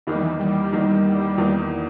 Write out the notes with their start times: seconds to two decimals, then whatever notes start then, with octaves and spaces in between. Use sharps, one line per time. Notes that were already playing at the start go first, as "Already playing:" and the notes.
0.07 E2 D#3 E3 A#3 D#4
0.15 G3
0.23 E3
0.40 G3
0.72 E2 D#3 A#3 D#4
1.38 E2 D#3 A#3 D#4